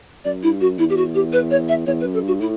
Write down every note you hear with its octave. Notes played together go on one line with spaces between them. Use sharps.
F#2 D5
G2 E4
F#2 F#4
E2 E4
G4
F#4
G4
B4
C#5
E5
E2 C#5
B4
F#2
A4
G2 F#4
A2 E4